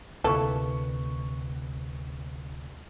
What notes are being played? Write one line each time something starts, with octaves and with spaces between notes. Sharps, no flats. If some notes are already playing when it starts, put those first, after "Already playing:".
D2 C3 A#3 E4 A4 B4 C#6